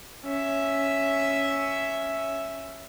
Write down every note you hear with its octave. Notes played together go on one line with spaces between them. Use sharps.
C#4 E5